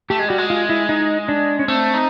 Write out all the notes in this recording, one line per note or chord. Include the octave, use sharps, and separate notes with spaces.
A3 G4
G#3
G3 F#4
G#3
F4
E4
D#4
D4
C#4
A3 C4
D#4